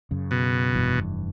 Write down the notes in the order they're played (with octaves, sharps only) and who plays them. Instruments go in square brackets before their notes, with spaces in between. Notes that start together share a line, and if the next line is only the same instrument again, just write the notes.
[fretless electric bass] F#2 C#3
[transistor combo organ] B2
[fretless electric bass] F1 G2 E3